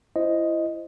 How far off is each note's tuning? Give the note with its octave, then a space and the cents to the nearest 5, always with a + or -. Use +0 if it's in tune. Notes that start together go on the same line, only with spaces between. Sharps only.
E4 +25 C5 +0 D#5 +0